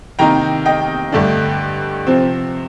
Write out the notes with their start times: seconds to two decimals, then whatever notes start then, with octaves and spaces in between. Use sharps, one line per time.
0.19 C3 D#3 A#3 D#4 G5 A#5
0.66 D#5 G5
1.12 G2 D3 A3 D4
2.07 C3 F3 C4